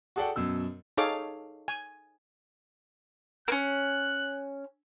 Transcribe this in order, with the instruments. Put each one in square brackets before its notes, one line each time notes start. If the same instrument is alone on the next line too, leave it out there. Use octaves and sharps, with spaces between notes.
[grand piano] F#4 G#4 A4 D5 F#5 G5
F#2 B2 E6
[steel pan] D#4 G#4 A4 C#5 F5 D6
G#5
[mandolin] A#3 C#4 [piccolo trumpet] F#6